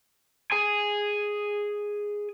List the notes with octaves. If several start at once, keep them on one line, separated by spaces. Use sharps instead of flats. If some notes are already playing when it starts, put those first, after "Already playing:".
G#4 G#5